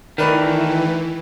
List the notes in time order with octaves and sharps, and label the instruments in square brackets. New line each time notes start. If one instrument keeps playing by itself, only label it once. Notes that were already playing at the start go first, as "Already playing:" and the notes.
[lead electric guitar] D#3 A3 [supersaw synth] E3 [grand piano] A#4 B4 D5